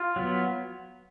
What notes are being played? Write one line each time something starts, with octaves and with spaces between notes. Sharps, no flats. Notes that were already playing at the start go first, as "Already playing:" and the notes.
Already playing: F4
F#3 B3